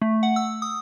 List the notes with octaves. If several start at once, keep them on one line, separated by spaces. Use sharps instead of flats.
A3
F#5
E6
D#6